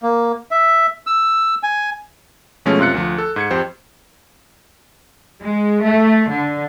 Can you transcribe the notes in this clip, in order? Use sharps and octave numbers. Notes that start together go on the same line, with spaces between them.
A#3
E5
E6
G#5
B2 F3 G#3 A3 C#4
F#2 C3 F4 F#6 C#7
D2 F3
A4
G#2 G#6 C#7
F2 G4 C5
G#3
A3
D3